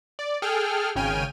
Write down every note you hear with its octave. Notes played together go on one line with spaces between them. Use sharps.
D5
G#4 A4 G5 F6
G#1 C#3 G5 G#5 F6 D#7